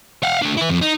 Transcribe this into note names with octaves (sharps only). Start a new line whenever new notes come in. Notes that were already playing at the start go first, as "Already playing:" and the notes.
F5 F#5
A3 D4
E4 B4
F2
D#4